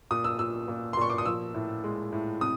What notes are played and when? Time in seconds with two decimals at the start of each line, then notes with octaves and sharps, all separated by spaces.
0.11 A#2 D#6
0.24 E6
0.39 A#2 E6
0.68 A#2
0.93 C6
0.97 A#2 C#6
1.10 D6
1.18 D#6
1.26 F3 E6
1.54 A2
1.84 G#3
2.12 A2
2.41 C3 D#6